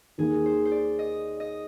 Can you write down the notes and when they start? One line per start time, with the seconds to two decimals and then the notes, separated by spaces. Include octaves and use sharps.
0.18 D#2 D#3 A#3 G#4
0.46 C5
0.65 C5
0.72 D5
0.99 D#5
1.40 D#5